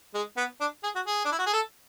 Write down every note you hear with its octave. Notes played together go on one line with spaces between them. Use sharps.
G#3
B3
D4
G#4
F#4
G#4
D4
E4
F#4
G#4
A4